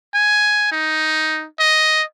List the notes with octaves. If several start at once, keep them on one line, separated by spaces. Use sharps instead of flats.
G#5
D#4
D#5